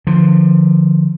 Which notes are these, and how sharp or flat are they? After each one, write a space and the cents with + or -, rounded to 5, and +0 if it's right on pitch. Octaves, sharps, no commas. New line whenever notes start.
D3 +30 F3 +0